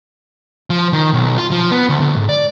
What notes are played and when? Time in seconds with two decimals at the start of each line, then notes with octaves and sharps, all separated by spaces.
0.70 F3
0.93 D#3
1.13 B1
1.37 F4
1.51 F3
1.71 B3
1.89 D2
2.01 D2
2.16 G#2
2.29 D5